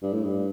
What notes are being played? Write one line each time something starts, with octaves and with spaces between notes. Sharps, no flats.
G2
A2
G2